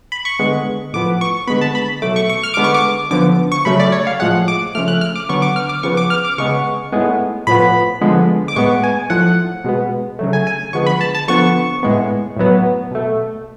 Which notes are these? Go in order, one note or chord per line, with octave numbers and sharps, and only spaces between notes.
B5
C#6
D3 G#3 B3
A2 F3 B3 D6
C#6
D3 G#3 B3 B5
A5
B5
B2 F#3 A3 D6
C#6
C#6
F6
D3 G#3 B3 D6
C#6
D6
D3 F3 B3 D6
C#6
C#3 F#3 A3 B5
D5
C#5
F5
A2 F3 G#3 F#5
D6
C#3 F3 A3 F6
F#6
F6
D6
D3 F#3 B3 C#6
D6
F6
D6
C#3 F3 B3 C#6
D6
F6
D6
C#3 G#3 B3 C#6
A2 G#3 B3
A2 F3 B3 B5
D3 F3 G#3 B3
D6
A2 G#3 B3 C#6
G#5
A2 F3 A3 F#5
B2 G#3 B3
C#3 F#3 A3
G#5
G#5
D3 F3 G#3 B3 C#6
B5
A5
A5
D3 F3 B3 C#6
A2 G#3 B3
A2 F#3 B3
B2 A3